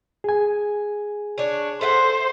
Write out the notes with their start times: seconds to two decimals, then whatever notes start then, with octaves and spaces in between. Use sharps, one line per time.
0.24 G#4 G#5
1.38 D4 C#5
1.81 A4 C5 E5 F#5